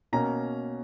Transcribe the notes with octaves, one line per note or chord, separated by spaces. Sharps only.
B2 A#3 C#4 A#5